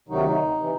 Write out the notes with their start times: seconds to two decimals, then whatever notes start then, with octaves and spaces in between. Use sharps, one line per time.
0.08 D2 C3 D#3 F#3 D#4
0.57 C3 E3